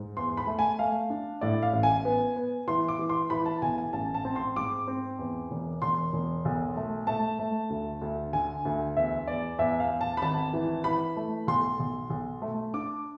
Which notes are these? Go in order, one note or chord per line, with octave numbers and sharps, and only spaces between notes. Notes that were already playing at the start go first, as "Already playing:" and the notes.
Already playing: G#2
E2 C6
B5
A3
G#5
A3 F5
D4
A2 D5
F5
A1
G#5
B3
B3
E3 C6
D6
E3
C6
E3 B5
A5
B1 G#5
G#5
A1 A5
A5
C4
C6
G#2 D6
C4
E2
E1
E1 C6
E1
B1
A3
A3 A5
A3
D2
D2
D3 G#5
D2
E2 E5
E2 D5
E2 E5
F5
E2
A5
B5
G#1 A5
E3
E3 B5
A3
B1 C6
B1
B1
A3
D4 D6